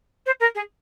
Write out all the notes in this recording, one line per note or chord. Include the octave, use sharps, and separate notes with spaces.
C5
A#4
G#4